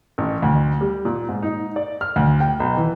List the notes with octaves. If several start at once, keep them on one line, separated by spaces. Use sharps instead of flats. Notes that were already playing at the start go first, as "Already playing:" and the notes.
A1
D2
G3
A#2
G#2
D#4
D5
F6
D2
G5
B1
E3